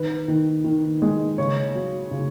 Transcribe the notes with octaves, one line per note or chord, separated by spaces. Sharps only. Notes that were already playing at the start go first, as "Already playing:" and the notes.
Already playing: D#3 B4
D#3
D#3
G#3
C#3 C#5
F#3
C#3